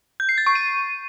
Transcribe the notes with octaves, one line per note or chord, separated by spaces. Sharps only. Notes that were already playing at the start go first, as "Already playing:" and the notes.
G6
C7
A6
C#6
D#7